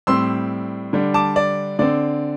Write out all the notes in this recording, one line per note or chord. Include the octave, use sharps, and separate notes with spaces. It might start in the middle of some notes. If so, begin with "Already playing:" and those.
A2 G3 C4 C6 E6
D3 G3 D4
A5 D6
D5
D3 C4 D5